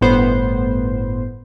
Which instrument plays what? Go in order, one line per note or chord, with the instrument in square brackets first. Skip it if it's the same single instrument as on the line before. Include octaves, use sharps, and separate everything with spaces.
[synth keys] G1 A2 B3 C5